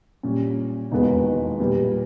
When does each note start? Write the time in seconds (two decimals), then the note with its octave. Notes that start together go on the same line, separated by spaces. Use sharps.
0.23 A#2 G3 C#4
0.92 E1 D#2 D#3 G#3 B3
1.59 A#2 G3 B3